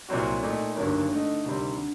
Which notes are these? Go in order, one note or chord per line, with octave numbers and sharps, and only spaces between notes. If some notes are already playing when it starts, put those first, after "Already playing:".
C2 A#2 F#3 C4 F#4
A#2 A3 D#4
G1 G2 D#3 F#3 A#3
D3 A3 D#4
D2 C3 D#3 G3 C4
D3